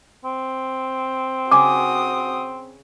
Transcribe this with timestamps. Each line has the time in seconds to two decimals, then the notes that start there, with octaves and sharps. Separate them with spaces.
0.24 C4
1.51 C#3 F#4 G#5 D6 D#6